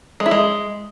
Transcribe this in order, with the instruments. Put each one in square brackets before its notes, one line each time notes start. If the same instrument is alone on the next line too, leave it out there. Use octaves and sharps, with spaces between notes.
[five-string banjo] G#3
E4
G#3